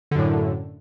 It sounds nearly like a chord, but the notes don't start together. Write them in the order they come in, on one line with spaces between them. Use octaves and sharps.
D3 F#2 A2